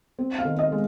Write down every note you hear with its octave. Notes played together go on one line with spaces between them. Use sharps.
C4
F5
D#3
D#5
G#3